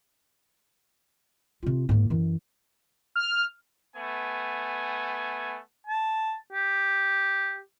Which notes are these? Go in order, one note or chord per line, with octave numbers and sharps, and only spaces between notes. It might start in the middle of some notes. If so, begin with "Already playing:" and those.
C3 F4
G#2 A#3
F#2 E3
F6
A3 B3 G#5
A5
G4